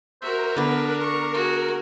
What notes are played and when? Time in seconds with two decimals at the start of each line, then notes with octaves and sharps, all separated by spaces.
0.22 F#4 A#4 C5 E5
0.57 D3 B3 D4 B4
1.01 C#6
1.34 F#4 G#4